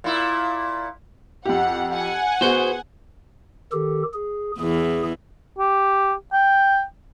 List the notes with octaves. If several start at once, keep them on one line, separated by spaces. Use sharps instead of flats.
A#2 E4
F2 G4 F#5
F#5 G#5
B3 F#4 G#4 C5
D#3 G4 A4
G#4
E2 E3 G#4
G4
G5